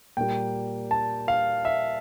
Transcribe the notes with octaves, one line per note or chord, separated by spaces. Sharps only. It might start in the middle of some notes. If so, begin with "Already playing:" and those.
A#2 G3 A#3 G5
A5
F5
E5